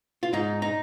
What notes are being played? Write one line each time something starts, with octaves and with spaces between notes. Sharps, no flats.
F4
G#2 D#4
D#4